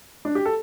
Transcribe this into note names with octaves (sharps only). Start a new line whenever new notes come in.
D4
G4
A4